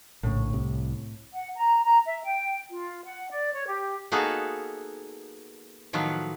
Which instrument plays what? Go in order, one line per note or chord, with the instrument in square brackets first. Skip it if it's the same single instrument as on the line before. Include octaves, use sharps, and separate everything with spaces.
[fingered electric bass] A#1 C#3 [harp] A2
[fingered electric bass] C2 C3
[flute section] F#5
A#5
A#5
E5
G5
F4
F#5
D5
C#5
G4
[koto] A#3 B3 D#4 F#4 G#4 A4
A2 D#3 F3 F#3 B3